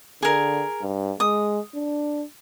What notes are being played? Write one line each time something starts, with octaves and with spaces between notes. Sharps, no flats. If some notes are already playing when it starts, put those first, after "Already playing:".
D3 G#4 A#4
G2
G#3 D#6
D4